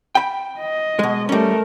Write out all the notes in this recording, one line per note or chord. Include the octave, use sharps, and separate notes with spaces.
G5 B5
D#5
B2 G#3
G3 A3 C#4 A#4